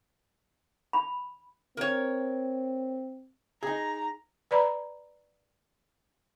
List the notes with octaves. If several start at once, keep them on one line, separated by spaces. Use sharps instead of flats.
B5
C4 A#4 C#5
D#4 G#4 A#5
B4 D5 A#5 B5